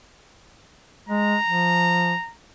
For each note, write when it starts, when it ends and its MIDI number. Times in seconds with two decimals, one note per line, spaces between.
1.09 1.37 56
1.09 2.32 82
1.45 2.14 53